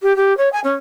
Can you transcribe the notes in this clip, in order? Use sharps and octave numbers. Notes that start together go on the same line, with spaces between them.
G4
G4
C#5
G#5
C#4